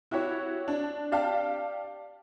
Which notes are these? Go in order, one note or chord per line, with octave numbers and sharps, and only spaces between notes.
E4 F#4 G4 C#5
D4
G4 D5 F5 G5 A5